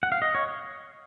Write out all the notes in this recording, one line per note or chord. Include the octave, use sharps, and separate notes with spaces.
F#5
F5
D#5
C#5